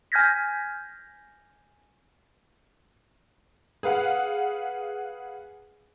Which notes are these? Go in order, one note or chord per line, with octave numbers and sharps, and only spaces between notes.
G#5 F6 G6 G#6 A#6 B6
G#4 B4 F5 F#5